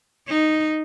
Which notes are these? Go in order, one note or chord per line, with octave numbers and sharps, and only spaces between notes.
D#4